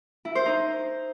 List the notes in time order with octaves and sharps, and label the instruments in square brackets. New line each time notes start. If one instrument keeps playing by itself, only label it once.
[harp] E4
C5
D#4